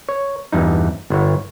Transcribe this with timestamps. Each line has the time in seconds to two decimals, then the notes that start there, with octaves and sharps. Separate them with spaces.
0.09 C#5
0.52 E2 G2 D#4
1.10 G1 C#5